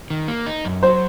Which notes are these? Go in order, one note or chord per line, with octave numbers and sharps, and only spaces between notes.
D#3
A#3
D#4
F#2
F#3 C5